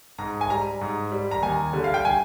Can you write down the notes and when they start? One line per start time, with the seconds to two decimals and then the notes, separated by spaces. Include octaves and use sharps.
0.18 G#2 A#5
0.41 G#5
0.50 G3 A#5
0.81 G#2
1.12 G3
1.31 A#5
1.42 D#2 G#5
1.73 D3 G3
1.84 F5
1.94 G5
2.05 G#5